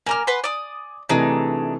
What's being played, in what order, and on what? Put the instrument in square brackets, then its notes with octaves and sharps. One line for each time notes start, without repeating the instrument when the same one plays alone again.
[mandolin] A#3 A#4 F6 [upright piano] G#5 D6
[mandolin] B4 F#5 C6
D5 D#6
[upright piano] C3 E3 A3 [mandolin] D4 D#4 G#4